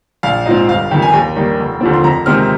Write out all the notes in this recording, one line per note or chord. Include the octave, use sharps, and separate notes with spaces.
A#1 F5
G#2 F3 C4 D#5
G1 F5
F2 D#3 G5
G#5
D#2 G5
D#3 G3 A#3
F1
D#2 D3 F3 C4
C6
F2 A#5
C3 D#3 G#3 C4 F6